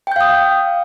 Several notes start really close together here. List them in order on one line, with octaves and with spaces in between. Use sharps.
G5 G6 F5 D#6